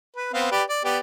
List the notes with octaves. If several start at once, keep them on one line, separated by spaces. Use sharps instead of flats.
B4
B3 C4 F5
G4 B4 D5
D5
B3 G4 D5